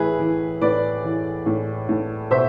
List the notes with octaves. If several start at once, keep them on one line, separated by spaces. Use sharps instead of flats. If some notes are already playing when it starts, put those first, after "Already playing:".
Already playing: A2 E3 G#4 B4 E5
E3
A2 B4 D5
E3
A2
A2
B2 C5 E5